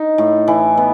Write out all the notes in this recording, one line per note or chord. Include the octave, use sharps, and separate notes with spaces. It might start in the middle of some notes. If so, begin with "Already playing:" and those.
Already playing: D#4
A2
E3
B3